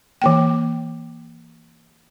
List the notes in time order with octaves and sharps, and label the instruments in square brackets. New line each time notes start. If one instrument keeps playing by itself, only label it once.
[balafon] E3 A#3 G5